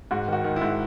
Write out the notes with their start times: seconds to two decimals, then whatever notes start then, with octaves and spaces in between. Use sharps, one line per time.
0.11 G#2 F#4
0.28 D#3 F#4
0.44 D#3
0.56 E4
0.61 G#2